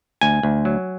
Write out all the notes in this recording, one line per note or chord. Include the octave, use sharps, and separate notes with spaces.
D2 G#5
D2
F#3